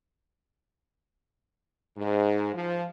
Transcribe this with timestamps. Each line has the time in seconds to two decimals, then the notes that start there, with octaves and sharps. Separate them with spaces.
1.98 G#2
2.54 F3